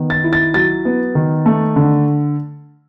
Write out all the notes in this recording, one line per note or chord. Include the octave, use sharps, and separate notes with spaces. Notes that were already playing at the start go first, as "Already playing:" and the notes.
Already playing: D#3 B3
A6
E4
A6
F#3 A6
B3
D#3
A3
D3